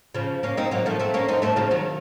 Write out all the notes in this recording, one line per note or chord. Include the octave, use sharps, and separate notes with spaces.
C#3 F3
A#3 C#4
C4 D#4
F#3 A#3
F3 A3
A3 C4
A#3 C#4
C4 D#4
A3 C4
C#3 F3
D#3 F#3